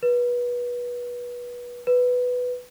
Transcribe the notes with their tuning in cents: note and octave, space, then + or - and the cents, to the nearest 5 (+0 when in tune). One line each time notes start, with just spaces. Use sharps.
B4 -25
B4 +5